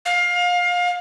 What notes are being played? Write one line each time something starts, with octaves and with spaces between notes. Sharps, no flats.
F5